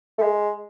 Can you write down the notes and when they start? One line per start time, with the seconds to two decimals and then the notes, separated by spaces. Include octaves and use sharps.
0.18 A3
0.22 G#3